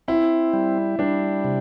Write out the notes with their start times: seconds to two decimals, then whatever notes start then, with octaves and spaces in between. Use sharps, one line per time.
0.08 C4 E4
0.53 G3
0.99 G3 D4
1.44 C3